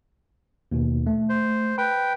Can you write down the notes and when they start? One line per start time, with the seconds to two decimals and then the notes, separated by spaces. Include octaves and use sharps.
0.72 D#2 B2
1.07 A3
1.29 C5
1.78 B4 G5 B5